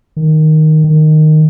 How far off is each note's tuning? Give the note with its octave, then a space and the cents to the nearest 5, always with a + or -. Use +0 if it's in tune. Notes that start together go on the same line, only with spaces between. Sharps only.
D#3 +0
D#3 -10